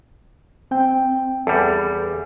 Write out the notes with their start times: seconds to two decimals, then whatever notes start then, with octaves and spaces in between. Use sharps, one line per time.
0.71 C4 G5
1.47 E2 G3 A4